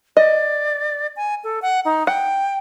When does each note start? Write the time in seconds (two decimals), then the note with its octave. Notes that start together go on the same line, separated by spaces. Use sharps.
0.17 D5 D#5
1.16 G#5
1.44 A4
1.62 F#5
1.85 D#4
2.07 F#5 G5